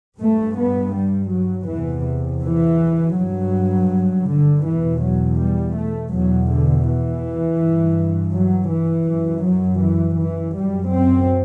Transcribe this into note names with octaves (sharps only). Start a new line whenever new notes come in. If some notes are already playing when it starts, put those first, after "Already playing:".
G2 A3
B3
G3
F#3
E2 E3
C3
E3
G2 F#3
D3
E2 B2 E3
F#3
G3
A3
E2 B2 F#3
D3
E3
G2
F#3
E3
F#2
F#3
E3
E3
F#2 G3
C4